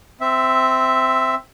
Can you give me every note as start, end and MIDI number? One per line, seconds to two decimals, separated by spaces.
0.21 1.35 60
0.21 1.35 76